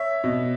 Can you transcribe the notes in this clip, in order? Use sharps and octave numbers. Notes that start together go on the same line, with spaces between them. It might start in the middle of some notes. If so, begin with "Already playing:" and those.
Already playing: C#5 E5
B2